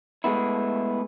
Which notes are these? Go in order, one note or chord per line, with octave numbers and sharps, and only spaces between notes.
G#3 A3 B3 E4